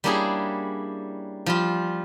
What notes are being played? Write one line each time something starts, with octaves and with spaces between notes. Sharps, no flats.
G3 A#3 C#4 D4 E4 G#4
F3 G3 F4